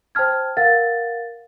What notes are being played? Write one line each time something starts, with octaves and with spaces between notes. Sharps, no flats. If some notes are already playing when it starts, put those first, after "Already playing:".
C5 G5 A5 F6 G#6
A#4 F5 F#5 A6